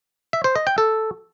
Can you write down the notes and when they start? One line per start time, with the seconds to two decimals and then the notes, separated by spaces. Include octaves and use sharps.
0.33 E5
0.44 C5
0.55 D#5
0.67 G5
0.78 A4